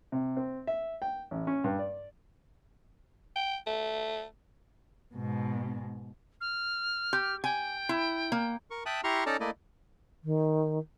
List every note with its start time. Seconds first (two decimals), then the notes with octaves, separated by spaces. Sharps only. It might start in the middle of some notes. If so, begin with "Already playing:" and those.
0.12 C3
0.37 C4
0.67 E5
1.02 G5
1.31 A1
1.47 C#4
1.64 G2
1.79 D5
3.36 G5
3.67 A3
5.15 G#2 B2
6.41 F6
7.13 G4
7.44 G5 G#5
7.89 E4
8.32 A#3
8.71 A#4 C#6
8.86 E5 G5 A5 D#6 F#6
9.04 E4 G4 A#5 C6 C#6 F6
9.26 C#4 D#4 A4 D5 A5 A#5
9.40 A3 A#3 E4 D5 D#5
10.24 D#3